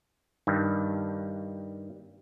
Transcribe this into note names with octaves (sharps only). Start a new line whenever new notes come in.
G2 D#3 G3